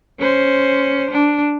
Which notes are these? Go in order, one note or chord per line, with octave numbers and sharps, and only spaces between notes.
C#4 C5
D4